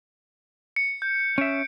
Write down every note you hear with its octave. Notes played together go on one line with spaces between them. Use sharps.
C#7
G6
C#4 E5 D7